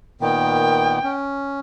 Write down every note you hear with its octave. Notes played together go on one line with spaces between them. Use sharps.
A#2 D#3 B3 G5
C#4